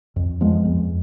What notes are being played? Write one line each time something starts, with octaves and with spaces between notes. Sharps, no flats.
F2
F3 G#3 B3
F2